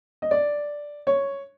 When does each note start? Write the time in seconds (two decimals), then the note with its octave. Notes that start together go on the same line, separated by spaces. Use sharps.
0.22 D#5
0.31 D5
1.07 C#5